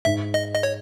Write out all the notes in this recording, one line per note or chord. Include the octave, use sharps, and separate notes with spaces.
G#2 E5
D#5
D#5
C#5